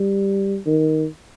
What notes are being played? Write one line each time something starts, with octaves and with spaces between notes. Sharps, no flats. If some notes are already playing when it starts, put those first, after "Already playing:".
Already playing: G3
D#3